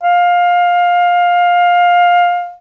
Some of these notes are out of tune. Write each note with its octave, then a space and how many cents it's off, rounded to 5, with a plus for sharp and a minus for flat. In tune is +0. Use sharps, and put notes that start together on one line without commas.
F5 +15